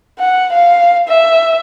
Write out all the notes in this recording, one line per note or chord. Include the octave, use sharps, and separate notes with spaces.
F#5
F5
E5